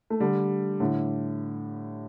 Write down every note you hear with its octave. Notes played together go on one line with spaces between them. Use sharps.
A3
D3 G3
A2 D3